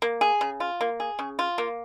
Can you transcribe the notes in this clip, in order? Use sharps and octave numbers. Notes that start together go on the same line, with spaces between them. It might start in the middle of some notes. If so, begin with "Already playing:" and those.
A#3
G#4
C#3
F4
A#3
G#4
C#3
F4
A#3